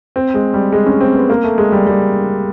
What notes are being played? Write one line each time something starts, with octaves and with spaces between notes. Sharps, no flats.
C4
G#3
G3
G#3
C#4
C4
B3
A#3
A3
G#3
G3
G3